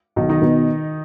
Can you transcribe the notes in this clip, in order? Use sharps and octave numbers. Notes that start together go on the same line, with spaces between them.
B1 D#3 D#4
D#3 D#4
B2 B3 D#4